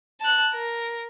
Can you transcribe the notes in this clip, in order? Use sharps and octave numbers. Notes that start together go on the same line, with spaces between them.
A5 F#6
A#4